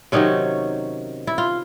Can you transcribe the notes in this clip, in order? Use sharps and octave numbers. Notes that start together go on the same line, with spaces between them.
C3 D#3 F#3 C#4 D#4
E4
F4